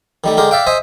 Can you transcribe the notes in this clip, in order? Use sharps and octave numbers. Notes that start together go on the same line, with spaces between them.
D#3 G3 A3
D3 G#3 G4 A#4
D5 E5 F5 G5
C5 D#5 E5 G#5